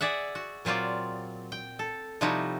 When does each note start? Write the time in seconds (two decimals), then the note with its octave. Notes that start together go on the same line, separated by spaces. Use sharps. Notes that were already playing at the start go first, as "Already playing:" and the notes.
0.01 G#4 D5 E5 F#5
0.35 F#4
0.65 A#2 F#3 C4 F4 D5
1.52 G5
1.79 A4
2.21 C3 F3 G3 D#4 E4 F#4